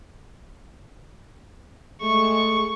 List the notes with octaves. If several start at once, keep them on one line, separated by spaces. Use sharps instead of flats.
G#3 A3 C#6